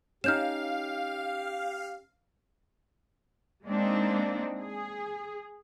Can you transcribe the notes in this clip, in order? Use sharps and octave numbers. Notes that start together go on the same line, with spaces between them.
C#4 D#4 G4 F5 F6 G6 E7
G#3 A#3 C4 D4 D#4
G#4